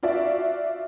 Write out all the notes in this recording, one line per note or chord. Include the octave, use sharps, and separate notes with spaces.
F4 F#4 D5 E5